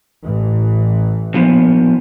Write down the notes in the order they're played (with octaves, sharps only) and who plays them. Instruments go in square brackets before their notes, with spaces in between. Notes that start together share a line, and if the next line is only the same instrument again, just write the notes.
[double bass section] A1 E3
[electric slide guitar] A#2 F3 B3